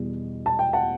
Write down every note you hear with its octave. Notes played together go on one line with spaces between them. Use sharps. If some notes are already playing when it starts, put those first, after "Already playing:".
Already playing: E2 B2 G3
A5
G5
F#5 A5